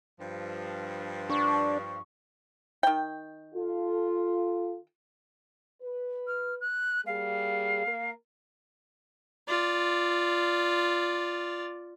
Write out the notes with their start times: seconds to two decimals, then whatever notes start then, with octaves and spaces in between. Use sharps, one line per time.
0.20 G2 F3
1.30 D4 C#6
2.83 D#3 G5
3.54 F4 A4
5.82 B4
6.27 F6
6.60 F#6
7.06 G3 A#3 G#4 F5
7.87 A#3 A#4
9.48 F4 D5